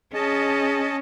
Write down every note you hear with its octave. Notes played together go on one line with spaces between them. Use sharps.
C#4 G#4 D#5 A5